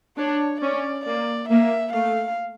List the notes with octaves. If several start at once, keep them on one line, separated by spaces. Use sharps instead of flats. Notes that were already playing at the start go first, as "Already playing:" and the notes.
D4 C#5
C#4 D5
A#3 D5
A#3 E5
A3 F5